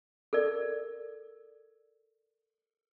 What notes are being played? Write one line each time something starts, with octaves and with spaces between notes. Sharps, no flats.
A4 A#4 D5